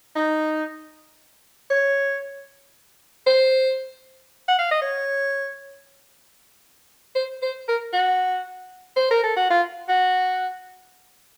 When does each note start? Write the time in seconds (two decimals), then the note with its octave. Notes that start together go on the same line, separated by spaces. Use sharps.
0.16 D#4
1.70 C#5
3.26 C5
4.48 F#5
4.58 F5
4.71 D#5
4.82 C#5
7.15 C5
7.42 C5
7.68 A#4
7.93 F#4
8.96 C5
9.11 A#4
9.23 A4
9.36 F#4
9.50 F4
9.88 F#4